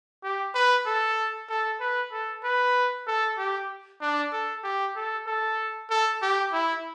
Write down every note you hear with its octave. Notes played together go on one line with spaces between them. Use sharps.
G4
B4
A4
A4
B4
A4
B4
A4
G4
D4
A4
G4
A4
A4
A4
G4
E4